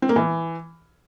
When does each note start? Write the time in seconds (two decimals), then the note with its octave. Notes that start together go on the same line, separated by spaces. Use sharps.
0.02 C4
0.09 A#3
0.16 E3